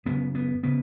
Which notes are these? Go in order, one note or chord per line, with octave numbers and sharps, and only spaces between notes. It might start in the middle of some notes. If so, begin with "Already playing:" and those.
F#1 F#2 C#3 B3
B3
C#3 B3